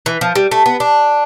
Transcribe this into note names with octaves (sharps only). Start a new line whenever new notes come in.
E3
F3
G3
A3
B3
D4